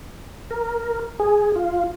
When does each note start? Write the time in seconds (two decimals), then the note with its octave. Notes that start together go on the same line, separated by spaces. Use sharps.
0.51 A#4
1.20 G#4
1.56 F4